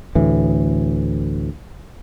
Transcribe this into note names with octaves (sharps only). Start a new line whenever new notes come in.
D2 A2 E3